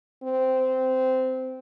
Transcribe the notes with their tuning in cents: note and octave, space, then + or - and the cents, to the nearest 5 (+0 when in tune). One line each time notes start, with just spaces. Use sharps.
C4 -15